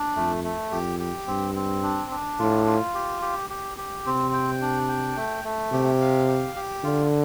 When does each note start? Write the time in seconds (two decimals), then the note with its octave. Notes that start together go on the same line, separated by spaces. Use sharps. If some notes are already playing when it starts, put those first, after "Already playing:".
Already playing: D4
0.16 F2 A3
0.44 A3
0.72 F2 G4
1.00 G4
1.27 G2 C4
1.55 C4
1.83 D4
2.11 D4
2.39 A2 F4
2.66 F4
2.95 G4
3.22 G4
3.50 G4
3.78 G4
4.06 C3 C4
4.33 G5
4.62 D4
4.89 G5
5.17 A3
5.44 A3
5.72 C3 G4
6.01 F5
6.28 G4
6.56 G4
6.84 D3 F4